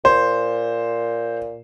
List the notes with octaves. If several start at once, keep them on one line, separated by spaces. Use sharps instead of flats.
A#2 C5